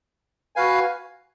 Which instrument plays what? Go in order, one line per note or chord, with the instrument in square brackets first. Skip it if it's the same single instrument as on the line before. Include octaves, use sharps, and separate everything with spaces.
[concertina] F#4 B4 F5 G#5